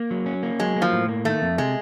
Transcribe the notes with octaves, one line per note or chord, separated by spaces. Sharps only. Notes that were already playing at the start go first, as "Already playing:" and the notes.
Already playing: A#3
F#3
C#4
A#3
F#3 G#3
A#3
F3
A2
A#3
D#3 A3
F2
C3 G#3